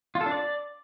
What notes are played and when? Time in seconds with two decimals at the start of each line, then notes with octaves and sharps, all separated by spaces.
0.15 F4
0.21 A4
0.26 D4
0.32 D5